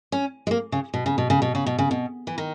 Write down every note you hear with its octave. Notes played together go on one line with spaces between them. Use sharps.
C#4
G#3
A#3
C#3
B2
C#3
B2
C#3
B2
C#3
B2
C#3
B2
E3
D#3